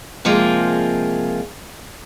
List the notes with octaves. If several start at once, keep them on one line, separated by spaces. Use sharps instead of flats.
C3 F3 G#3 A#3 F4